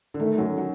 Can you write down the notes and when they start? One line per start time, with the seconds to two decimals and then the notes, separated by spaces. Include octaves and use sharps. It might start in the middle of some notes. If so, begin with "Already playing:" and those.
0.14 D3
0.20 D#3 A3
0.38 F#2 F#3
0.58 F#3